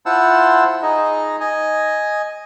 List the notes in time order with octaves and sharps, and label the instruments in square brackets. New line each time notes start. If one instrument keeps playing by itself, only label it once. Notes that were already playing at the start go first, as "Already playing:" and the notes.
[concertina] E4 F4 C5 F#5 A5 E6
D#4 G#4 D#5
D#5 G#5